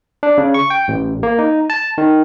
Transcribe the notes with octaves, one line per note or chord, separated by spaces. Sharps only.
D4
C#3
C#6
G5
A1
A#3
D#4
A5
D#3